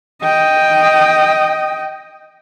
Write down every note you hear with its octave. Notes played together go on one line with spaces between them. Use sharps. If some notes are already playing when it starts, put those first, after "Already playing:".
D#5 G5